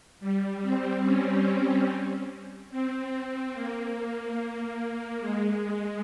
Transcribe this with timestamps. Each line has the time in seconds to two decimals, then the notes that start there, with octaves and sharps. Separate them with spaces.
0.20 G3
0.62 C4
1.04 C#4
2.71 C4
3.54 A#3
5.21 G#3